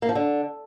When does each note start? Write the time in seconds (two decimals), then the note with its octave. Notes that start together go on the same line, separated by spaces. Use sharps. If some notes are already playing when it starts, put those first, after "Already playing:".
0.02 A#3
0.09 F3
0.15 D3